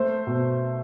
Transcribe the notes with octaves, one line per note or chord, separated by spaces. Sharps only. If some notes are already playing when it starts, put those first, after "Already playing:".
Already playing: A3 C5
B2